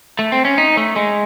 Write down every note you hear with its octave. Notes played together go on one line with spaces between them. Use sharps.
A3
C4
C#4
D#4
A3
G#3